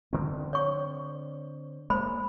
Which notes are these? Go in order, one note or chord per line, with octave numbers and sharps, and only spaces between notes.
D3 C4
C#5 C#6
G#3 A#3 C5 B5